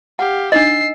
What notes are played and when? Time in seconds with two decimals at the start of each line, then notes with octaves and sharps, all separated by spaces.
0.19 G4 F5 F#5
0.52 D4 D#4 D#5 E6 C7